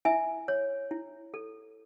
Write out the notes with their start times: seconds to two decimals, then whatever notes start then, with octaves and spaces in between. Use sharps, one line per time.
0.05 E4 E5 G#5
0.48 C#5
0.91 E4
1.34 A4